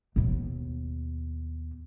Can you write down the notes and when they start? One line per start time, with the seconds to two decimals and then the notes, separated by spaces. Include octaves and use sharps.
0.16 D#2 B2